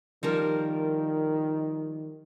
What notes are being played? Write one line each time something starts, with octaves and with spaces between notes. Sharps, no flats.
D#3 F3 G3 A#4